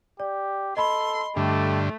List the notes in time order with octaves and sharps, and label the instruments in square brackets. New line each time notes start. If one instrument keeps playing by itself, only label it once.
[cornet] G4 [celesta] D5
[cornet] A4 [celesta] D#5 B5 [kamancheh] C6
[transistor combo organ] G2 D3 [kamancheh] A3 [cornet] G4